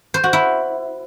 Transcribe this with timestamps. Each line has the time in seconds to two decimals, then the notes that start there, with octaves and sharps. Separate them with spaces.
0.14 C5
0.24 F#4
0.33 E4